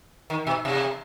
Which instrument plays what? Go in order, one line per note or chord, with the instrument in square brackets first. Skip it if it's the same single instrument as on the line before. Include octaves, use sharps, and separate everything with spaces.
[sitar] D#3
B2
C3